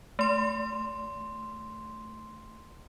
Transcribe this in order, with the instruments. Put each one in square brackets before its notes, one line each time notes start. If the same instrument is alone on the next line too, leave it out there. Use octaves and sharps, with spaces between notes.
[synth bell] A3 C6